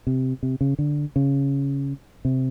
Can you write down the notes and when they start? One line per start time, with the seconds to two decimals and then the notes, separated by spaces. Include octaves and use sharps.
0.07 C3
0.43 C3
0.61 C#3
0.79 D3
1.16 C#3
2.25 C3